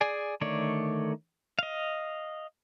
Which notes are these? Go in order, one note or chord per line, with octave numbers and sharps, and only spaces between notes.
G#4 D5 G#5
D3 D#3 A3 C#5 D5
D#5 F5